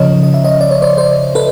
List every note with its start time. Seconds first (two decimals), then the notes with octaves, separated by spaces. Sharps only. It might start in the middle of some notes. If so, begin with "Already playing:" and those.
Already playing: C#3 F3 C#5 D#5
0.23 D#5
0.34 E5
0.44 C#5 D#5
0.61 D5
0.71 C#5
0.82 C5 D5
0.97 C5 D5
1.35 A4 B4